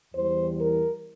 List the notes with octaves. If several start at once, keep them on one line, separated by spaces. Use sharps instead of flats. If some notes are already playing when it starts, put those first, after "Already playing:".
E2 E3 G3 C5
A#4